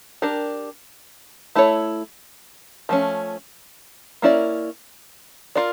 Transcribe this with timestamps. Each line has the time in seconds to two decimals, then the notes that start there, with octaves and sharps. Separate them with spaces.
0.22 D4 G4 A#4
1.55 A3 E4 A4 C#5
2.89 F3 A3 C#4
4.22 A#3 C#4 E4 A#4 D5
5.55 F4 A#4 D5